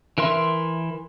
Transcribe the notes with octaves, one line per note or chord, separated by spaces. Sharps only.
E3 A#4 E5 C6